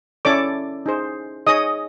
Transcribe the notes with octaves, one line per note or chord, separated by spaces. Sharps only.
C#4 E4 A4 C#5 D5 D6
D#4 G#4 C5
D#4 G#4 C#5 D#5 D#6